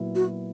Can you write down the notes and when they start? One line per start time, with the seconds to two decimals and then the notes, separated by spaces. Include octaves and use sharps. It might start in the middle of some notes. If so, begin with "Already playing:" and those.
Already playing: A#2 F#3 B3 E4
0.15 F#4